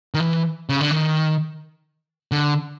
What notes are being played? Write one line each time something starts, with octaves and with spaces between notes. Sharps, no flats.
D#3
E3
C#3
D3
D#3
D3